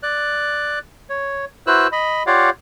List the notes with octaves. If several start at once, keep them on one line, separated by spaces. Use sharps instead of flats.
D5 F#6
C#5
E4 F#4 B4 C5 E6 F#6
D#5 B5
F4 G4 C#5 D5 F5 F#5